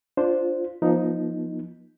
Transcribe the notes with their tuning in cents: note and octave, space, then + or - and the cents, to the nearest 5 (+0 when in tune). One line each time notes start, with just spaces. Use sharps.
D4 +0 F4 +0 C5 +0
F3 +0 B3 -45 D#4 +0